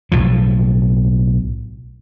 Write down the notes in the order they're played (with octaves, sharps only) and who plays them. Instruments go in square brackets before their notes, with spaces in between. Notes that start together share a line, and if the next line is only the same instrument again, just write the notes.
[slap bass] B1 A2 F3